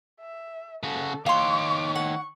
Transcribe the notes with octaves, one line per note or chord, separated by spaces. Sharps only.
E5
C#3 F#4 A4
D#3 C#5 F5 C6 D6
F#5 C#6